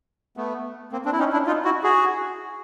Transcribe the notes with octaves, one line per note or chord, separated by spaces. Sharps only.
A3 B3
A#3 C4
C4 D4
E4
C#4 D#4
D4 E4
D#4 F4
E4 F#4
F#4 G#4